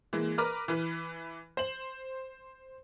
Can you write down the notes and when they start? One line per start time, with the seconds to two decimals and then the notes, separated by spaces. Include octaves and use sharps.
0.13 E3 G#3 A#3
0.38 A#4 B4 A#5 D6 F6
0.68 E3 B4
1.57 C5 F#7